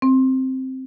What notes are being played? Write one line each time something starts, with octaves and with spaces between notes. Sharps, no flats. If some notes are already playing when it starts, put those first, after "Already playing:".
C4